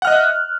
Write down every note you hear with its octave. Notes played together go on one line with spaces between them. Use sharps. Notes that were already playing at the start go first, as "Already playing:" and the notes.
D#5 E5 F#5 F6 F#6